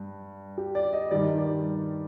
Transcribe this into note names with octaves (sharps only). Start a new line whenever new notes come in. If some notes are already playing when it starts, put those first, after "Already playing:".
Already playing: G2
G4
D5
D#5
G2 D#3 G3 D5
D5